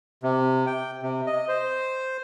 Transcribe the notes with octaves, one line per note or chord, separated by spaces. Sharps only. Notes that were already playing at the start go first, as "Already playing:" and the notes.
C3
G5
C3
D#5
C5